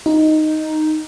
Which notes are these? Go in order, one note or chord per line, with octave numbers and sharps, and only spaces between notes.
D#4